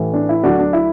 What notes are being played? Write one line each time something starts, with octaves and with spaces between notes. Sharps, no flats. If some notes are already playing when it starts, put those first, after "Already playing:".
Already playing: A1 A2 E3
D4
E4
D2 D3 F#3 D4 F#4
D4
E4